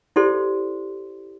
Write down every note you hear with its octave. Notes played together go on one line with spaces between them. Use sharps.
E4 G4 A4 C5 D5 C6